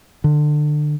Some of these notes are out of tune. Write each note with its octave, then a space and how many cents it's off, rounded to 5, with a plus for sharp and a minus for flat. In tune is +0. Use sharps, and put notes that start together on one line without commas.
D3 +25